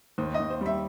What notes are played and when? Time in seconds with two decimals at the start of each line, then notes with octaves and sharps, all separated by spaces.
0.18 D#2 C5
0.34 D#5
0.39 D#2
0.50 C5
0.61 G3 E5